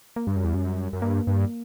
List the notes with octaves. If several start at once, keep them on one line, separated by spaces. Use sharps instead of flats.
A#3
G2 G3
F#2
E2
F#2
F#2
G2 A#3
G2